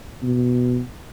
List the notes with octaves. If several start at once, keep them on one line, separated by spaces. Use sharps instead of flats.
B2